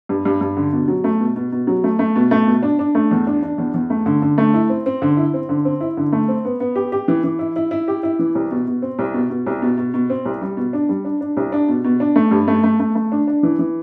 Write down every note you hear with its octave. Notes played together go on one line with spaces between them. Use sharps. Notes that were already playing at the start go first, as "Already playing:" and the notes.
G2
G2
G2
D3
B2
F#3
A3
B2
B2
B2
F#3
A3
A3
B2
A3
B2
D4
D4
A3
E2
D4
D4
E2
E2
A3
D3
D3
A3
E4
C4
C4
D3
E4
C4
D3
C4
E4
D3
A3
C4
B3
B3
G4
G4
E3
E3
E4
E4
E4
G4
E4
E3
C2
B2
B2
C4
C2
B2
B2
C2
B2
B2
B2
C4
C2
G3
B2
D4
G3
D4
D4
C2
D4
B2
B2
D4
A3
G2
A3
A3
A3
A3
D4
D4
E3
E3